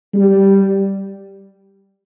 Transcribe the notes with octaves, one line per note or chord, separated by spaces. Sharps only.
G3